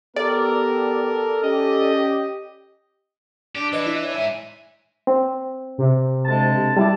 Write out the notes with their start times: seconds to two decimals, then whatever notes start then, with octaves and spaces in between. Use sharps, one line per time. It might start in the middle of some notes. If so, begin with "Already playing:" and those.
0.16 B3 G4 A4 A#4 D5
1.43 C#4 G4 D#5
3.55 D4 G4
3.73 E3 B4 D5 D#5
3.86 E4
4.03 C#5
4.15 G#2 E5 G#5
5.07 C4
5.78 C3
6.26 D2 G#3 A5
6.77 G3 E4 D5 A5